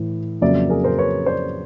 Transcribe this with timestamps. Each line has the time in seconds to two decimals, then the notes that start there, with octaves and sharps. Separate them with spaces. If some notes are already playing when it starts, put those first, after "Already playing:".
Already playing: A2 E3
0.41 F2 C#3 F#3 A#3 D5 E5
0.69 G#4 A#4
0.84 A#4 C5
0.98 B4 C#5
1.26 C5 D5